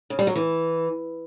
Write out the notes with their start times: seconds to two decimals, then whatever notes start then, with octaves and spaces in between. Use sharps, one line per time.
0.10 C#3
0.19 G3
0.27 F#3
0.36 E3